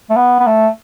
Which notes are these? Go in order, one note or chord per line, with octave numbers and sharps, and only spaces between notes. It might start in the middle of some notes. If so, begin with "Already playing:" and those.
A3
B3
B3
A3